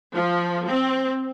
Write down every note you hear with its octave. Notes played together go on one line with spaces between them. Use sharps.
F3
C4